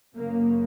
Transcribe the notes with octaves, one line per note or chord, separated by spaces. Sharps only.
F#2 C#3 A#3